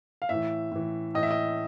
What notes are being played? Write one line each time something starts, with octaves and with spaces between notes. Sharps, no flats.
F5
A2 E3 E5
A2 E3
A2 E3 D#5
E5
D#5